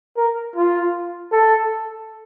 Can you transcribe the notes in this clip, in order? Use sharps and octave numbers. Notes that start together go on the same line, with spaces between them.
A#4
F4
A4